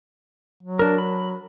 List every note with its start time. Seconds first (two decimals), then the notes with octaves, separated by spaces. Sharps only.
0.63 F#3
0.79 D4 A#4
0.98 B5